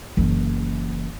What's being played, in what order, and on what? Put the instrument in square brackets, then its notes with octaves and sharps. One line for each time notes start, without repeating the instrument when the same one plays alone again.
[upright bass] F#1 E3